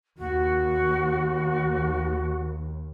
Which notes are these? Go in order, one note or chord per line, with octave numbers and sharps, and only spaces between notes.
D#2 F#4